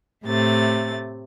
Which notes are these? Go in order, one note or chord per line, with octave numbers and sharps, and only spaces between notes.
A2 C3 A3 A6